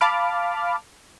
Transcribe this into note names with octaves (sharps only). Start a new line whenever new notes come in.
F5 A5 B5 D6 F6